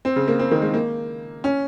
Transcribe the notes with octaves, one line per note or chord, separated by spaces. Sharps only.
C4
C#3
A#3
C4
D#3
G#3
A#3
C#4